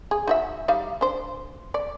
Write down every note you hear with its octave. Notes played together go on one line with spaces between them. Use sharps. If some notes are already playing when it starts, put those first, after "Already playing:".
G#4
D#4 F#4 E5
G3 D#4 F5
D4 C5
D5